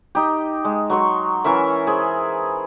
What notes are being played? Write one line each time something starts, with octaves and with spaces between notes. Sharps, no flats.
D#4 G4
G#3
F#3 C6 C#6
E3 C#4 A#4 E5
G#4 C5